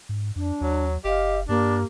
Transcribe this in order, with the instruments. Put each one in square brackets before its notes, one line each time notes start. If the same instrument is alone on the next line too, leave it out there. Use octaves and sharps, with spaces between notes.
[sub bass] G#2
[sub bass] F2 [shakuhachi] D4
[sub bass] D#2 [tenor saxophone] F#3
[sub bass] F#1 [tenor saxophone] G4 [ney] D#5 [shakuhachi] F5
[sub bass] G2 [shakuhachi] A#3 [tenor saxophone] D4 [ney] G4